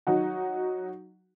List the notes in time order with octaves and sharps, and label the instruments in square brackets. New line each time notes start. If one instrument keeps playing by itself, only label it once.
[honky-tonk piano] F#3 D#4 F#4